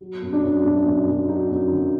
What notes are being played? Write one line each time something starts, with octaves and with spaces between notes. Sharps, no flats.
F#3
F#2
D4
F#2
F#2 D4
F#2
D#4
F#2
F#3 D#4
F#2
D3